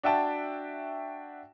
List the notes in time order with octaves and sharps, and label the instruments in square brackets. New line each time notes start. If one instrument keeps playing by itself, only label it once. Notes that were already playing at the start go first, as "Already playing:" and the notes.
[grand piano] D4 F#4 E5 G5 A5